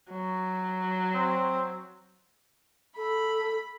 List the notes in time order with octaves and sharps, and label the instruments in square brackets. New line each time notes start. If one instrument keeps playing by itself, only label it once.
[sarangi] F#3
[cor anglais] C4
[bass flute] A4 [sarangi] B5